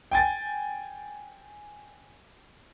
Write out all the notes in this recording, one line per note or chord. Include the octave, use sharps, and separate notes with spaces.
G5 G#5 A6